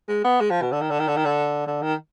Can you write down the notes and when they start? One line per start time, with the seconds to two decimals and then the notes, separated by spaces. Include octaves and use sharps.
0.08 G#3
0.24 B3
0.41 G#3
0.50 F3
0.62 B2
0.72 D3
0.81 D#3
0.90 D3
0.99 D#3
1.07 D3
1.16 D#3
1.25 D3
1.67 D3
1.82 D#3